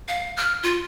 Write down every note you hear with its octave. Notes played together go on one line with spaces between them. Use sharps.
F5
F6
F4